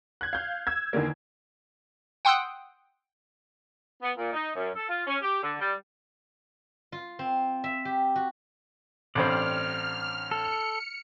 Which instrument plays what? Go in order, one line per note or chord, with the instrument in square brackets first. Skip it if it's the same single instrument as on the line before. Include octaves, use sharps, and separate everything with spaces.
[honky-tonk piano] F#6 G#6
F5 G6
E6 G#6
E2 D3 D#3 A#3
[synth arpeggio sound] F#5 G5 C6 D#6 E6 F#6
[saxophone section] B3
A#2
D#4
F#2
A4
F4
C#4
G4
D3
G3
[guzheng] F4
C4
E5
G4
F#4
[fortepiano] A1 G2 C4 [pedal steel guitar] D5 [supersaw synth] F6
[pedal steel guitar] A4 [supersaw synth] C#7